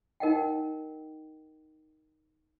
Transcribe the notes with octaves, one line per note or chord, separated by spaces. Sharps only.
D#4 A#4 D#5 F#5 G5